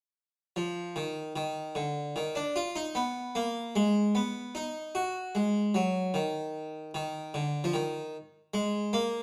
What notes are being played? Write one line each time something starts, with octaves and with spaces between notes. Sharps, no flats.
F3
D#3
D#3
D3
D#3
D4
F4
D#4
B3
A#3
G#3
B3
D#4
F#4
G#3
F#3
D#3
D#3
D3
F3
D#3
G#3
A#3